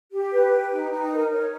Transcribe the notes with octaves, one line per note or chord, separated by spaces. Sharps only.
G4
B4
G5
D#4
D#4
A#4
C#5